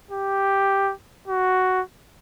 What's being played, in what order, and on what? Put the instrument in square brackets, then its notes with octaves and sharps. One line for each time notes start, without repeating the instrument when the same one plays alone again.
[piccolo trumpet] G4
F#4